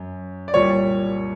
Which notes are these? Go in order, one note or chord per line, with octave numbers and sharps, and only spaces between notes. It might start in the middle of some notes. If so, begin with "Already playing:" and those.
Already playing: F#2
D5
C2 A#2 G3 C#5